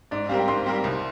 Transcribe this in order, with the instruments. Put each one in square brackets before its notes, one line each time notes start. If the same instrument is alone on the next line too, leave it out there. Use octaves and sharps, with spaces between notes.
[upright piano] G#2 [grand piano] D5
[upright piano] G3 C4 G4 A#4 [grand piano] F5
[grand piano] G5
[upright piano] G#2 [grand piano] C6
[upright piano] G3 C4 G4 A#4
C2